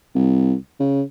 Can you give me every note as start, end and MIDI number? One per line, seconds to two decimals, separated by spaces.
0.15 0.55 36
0.80 1.02 49